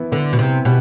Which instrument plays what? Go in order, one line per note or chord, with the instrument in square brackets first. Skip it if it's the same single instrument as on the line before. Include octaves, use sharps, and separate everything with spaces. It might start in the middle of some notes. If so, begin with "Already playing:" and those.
Already playing: [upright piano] E3 B3 E4
[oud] D3 [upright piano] B3
[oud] B2
[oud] C3 [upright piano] E4
[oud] B2 [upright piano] G4